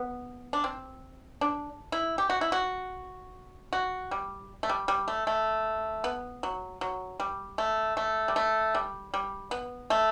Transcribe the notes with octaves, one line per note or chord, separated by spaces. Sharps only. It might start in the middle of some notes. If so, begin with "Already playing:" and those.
Already playing: B3
D4
C4
D4
E4
G4
F#4
E4
F#4
F#4
G3
A3
G3
G3
A3
A3
B3
F#3
F#3
G3
A3
A3
G3
A3
G3
G3
B3
A3